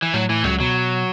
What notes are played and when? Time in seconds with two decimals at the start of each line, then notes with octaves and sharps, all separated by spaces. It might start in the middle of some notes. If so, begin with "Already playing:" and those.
0.02 E3
0.14 A2 F#3
0.29 A2 E3
0.44 C#2 C#3 F#3
0.60 B2 F#3